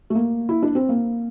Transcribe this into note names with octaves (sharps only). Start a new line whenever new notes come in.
A3
A#3
E4
D4
C4
A#3